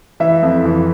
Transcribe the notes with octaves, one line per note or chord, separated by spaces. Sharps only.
E3 E5
F2
E3